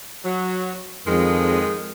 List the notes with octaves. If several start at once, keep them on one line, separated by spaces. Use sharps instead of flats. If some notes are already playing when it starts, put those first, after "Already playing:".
F#3
F2 D#3 G#3